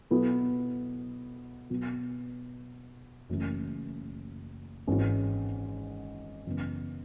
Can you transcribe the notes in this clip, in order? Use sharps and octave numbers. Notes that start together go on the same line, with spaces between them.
B2 F#3 B3 E4 A4
B2 F#3 B3
F#1 F#2 E3 A3
G#1 G#2 E3 G#3 C#4
F#2 C#3 E3 B3